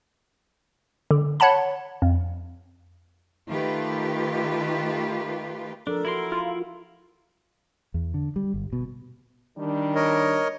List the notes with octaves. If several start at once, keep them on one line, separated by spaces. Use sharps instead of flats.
D3
C#5 F#5 A5 B5
F2
D#3 A3 F4 G4 B4
E3 F3 D4 A4 A#4
E4 F#4 A#4 C6
F4
E2
D3
G3
G1
B2
D#3 G3 D4
A#4 C#5 D#5